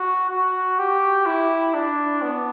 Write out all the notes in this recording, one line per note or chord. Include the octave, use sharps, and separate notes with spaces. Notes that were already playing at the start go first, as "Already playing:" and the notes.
Already playing: F#4
F#4
G4
E4
D4
B3